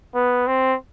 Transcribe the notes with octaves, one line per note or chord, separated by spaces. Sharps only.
B3
C4